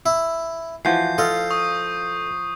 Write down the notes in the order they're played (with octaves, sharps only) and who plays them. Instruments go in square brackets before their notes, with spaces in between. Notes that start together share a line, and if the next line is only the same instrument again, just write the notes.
[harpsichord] E4 E5
[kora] E3 F3 F#4 [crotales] G6 C7
[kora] F4 [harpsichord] A4 D#5 F5
[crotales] C#6 D#6